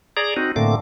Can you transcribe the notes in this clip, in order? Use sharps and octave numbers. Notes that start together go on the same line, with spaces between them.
G#4 D5 A#5
C4 D#4 F#4
A2 D3 A3 A#3 C4 D6